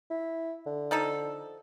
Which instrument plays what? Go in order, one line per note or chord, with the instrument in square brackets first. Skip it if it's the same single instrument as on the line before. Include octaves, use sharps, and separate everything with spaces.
[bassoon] E4
D3
[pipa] F3 D#4 A4